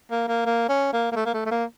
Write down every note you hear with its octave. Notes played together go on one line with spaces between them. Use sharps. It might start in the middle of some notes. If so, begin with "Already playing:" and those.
A#3
A#3
A#3
C#4
A#3
A#3
A3
A#3
A3
A3
A#3